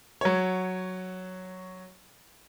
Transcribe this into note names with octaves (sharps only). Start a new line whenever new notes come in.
F#3 C#5